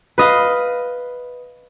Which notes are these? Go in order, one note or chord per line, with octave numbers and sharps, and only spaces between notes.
B4 D#5 F5